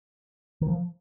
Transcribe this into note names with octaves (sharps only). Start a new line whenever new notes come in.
D#3
F3